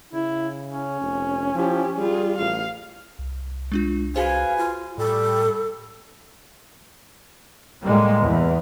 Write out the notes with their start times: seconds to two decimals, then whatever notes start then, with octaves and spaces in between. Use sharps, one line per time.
0.13 C#3 E4
0.70 C#4
1.01 F1
1.55 F3 E4 G4
1.98 G3 F4 G#4
2.39 A1 F5
3.19 C2
3.72 G#3 D4 F4
4.16 F#4 G#4 B4 C5 F5 G#5
4.58 F4
4.98 A2 G3 A4
7.85 A2 G3 G#3 A#3
8.22 E2